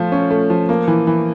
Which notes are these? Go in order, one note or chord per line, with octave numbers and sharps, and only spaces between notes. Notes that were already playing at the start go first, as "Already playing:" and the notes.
Already playing: F3 A3 F4
C#4
A3
F3
A#3
E3
E3